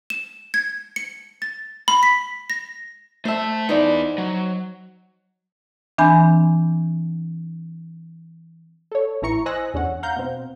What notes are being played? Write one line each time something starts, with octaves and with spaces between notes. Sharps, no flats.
E7
G#6
C#7
A6
B5
B6
A#6
A3 C5 E5 A5
B3 D#4 E4 C5 D5
F#3
E3 C4 D4 G#5 B5 G6
A4 C#5
A1 E3 E4 A#5 C#6 C#7
C5 D#5 G#5 E6 F#6 A#6
E2 D3 C#4 F#5
F5 F#5 A#5 G6
B2 C4